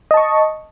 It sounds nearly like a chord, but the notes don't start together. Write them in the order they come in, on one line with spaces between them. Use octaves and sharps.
D#5 A5 C#6